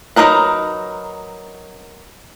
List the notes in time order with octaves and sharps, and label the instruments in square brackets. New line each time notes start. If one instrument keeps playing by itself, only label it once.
[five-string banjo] F#3 C#4 D#4 A#4 B4